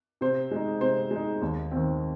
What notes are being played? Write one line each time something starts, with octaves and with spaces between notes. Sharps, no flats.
C3 C5
G#3 D#4
C3 C5
G#3
D#4
D#2
D#3 C4